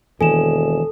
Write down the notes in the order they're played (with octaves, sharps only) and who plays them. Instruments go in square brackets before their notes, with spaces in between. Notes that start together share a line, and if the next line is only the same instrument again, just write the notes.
[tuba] E1 [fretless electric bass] D#3 E3 A#3 [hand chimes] A4 [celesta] G#5 E7